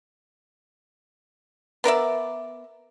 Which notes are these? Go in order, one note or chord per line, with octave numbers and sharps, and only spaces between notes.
B3 A#4 D5 E5